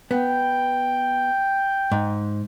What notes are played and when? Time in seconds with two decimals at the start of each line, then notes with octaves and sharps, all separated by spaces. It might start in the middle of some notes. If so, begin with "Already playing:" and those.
0.11 B3 G5
1.92 G#2